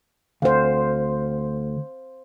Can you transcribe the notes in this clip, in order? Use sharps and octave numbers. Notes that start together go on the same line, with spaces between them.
D2 C5 F5